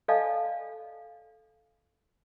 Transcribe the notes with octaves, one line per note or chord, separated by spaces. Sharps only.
A4 D5 D#5 F5 G#5 A5